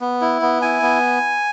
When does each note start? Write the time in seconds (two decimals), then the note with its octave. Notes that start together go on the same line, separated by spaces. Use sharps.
0.01 B3
0.21 E4
0.42 B3
0.62 E4 G#5
0.82 B3